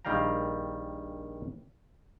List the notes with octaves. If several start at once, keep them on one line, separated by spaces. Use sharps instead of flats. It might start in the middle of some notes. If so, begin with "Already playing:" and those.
A#1 D#3 G3 F5 G5 A#5